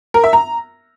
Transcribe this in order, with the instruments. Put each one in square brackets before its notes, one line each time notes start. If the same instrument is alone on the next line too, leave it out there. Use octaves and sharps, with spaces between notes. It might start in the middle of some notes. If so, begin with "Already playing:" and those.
[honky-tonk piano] A#4
E5
A#5